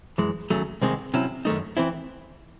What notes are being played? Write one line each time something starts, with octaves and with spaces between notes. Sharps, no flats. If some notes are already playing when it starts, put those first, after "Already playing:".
F#2 E3 G#3
D#2 C#3 F#3 A3
C2 C3 D#3 G#3 C4
C3 F#3 C#4 E4
F#2 D#3 A3 D#4
E3 C4 E4